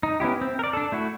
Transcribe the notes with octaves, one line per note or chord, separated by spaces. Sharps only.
D#4
B3 C#4 E4 G4
C4
A#4 D5
D4 A4
A3 E4 F#4